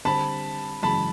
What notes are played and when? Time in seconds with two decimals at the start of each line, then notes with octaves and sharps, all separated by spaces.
0.05 D3 G3 C4 A5 B5
0.83 F#2 C#3 E3 G#3 A5 B5